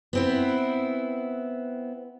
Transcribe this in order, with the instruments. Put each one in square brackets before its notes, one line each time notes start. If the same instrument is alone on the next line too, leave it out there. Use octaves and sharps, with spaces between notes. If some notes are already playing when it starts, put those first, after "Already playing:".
[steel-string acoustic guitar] B3 C4 E4